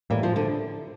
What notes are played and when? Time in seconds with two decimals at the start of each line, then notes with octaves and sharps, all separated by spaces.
0.10 A2 E3 G3 A#3
0.23 F3
0.36 D3